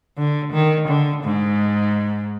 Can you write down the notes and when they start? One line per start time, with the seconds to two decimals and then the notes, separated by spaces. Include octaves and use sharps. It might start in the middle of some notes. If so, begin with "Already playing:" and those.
0.18 D3
0.53 D#3
0.88 D3
1.23 G#2